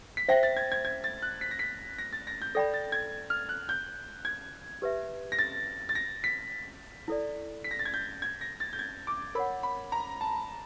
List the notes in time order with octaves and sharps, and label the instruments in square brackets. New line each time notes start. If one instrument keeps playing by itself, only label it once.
[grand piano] B6
[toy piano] C5 E5 G5 [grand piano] A#6
[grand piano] A6
G#6
G#6
G#6
A6
F#6
B6
A#6
B6
A#6
A6
A#6
G6
[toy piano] A4 D5 G5 B5 [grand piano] A#6
[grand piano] A6
G#6
F6
F#6
G6
G#6
[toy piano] G4 B4 E5
[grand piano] A#6
A6
A6
A#6
B6
[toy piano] E4 A4 D5
[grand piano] B6
A#6
A6
G#6
G6
G#6
A#6
A6
G6
G#6
D6
[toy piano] A#4 C#5 F#5 [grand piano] B5
[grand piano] B5
A#5
A5